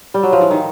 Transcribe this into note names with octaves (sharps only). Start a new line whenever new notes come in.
G3
F#3
F3
E3
D#3